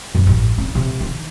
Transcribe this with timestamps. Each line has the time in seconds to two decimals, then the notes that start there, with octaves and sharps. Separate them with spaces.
0.15 F#2
0.27 A1
0.58 C#4
0.75 C3
1.01 D#3